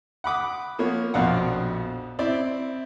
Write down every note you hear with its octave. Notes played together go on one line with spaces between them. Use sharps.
F#5 B5 D6 D#6
F3 A#3 B3 C#5
A#1 F2 B2 D4 F5 F#5
C4 E4 D5